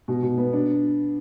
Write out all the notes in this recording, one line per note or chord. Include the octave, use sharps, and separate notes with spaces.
B2
B2
B3
D4